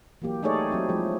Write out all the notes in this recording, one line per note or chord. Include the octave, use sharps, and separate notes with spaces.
E3 F#3 A#3 G4
A3 D#4 G#4 A4 C#5 D5
G4
F#3 C4 E4
F3 G#3